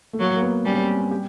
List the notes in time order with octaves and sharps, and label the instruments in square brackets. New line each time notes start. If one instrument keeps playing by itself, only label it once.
[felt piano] A3
[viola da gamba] F#3 [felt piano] A#3
[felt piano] A#3
B3
[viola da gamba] G3 [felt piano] C#4
[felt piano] C4
C#4
G4